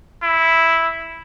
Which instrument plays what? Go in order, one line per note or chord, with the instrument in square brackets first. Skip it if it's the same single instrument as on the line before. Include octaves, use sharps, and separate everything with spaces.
[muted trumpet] E4